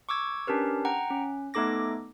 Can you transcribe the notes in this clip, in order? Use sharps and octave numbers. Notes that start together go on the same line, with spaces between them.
C#6 D6 E6 G#6
C#4 D4 G4 A#4 B4
F#5 G5 A#5
C#4
A3 B3 D#4 A4 D6 A#6